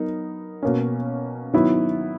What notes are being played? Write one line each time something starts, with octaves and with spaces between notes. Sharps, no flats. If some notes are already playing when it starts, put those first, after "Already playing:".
Already playing: F#3 B3 D#4 A#4
B2 A#3 C#4
D#3 F#3 B3 E4